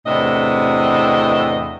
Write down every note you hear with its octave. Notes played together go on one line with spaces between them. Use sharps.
E2 A2 C3 D4 D#5